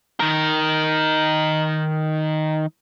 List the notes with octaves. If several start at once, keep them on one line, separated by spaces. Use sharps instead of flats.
D#3 A#4